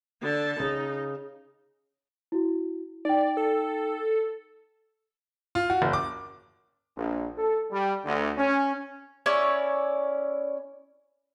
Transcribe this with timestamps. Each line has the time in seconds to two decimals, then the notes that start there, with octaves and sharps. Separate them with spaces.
0.23 D3 A5
0.60 C#3 D#4
2.32 E4 F#4
3.05 D#4 D5 G5
3.37 A4
5.55 F4
5.70 F#4
5.82 F#1
5.93 D6
6.96 A#1
7.37 A4
7.71 G3
8.05 D2
8.38 C#4
9.26 C#4 E4 C#5 D5